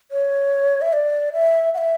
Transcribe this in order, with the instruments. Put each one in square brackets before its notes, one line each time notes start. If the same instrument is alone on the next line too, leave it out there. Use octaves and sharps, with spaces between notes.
[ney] C#5
E5
D5
E5
F#5
E5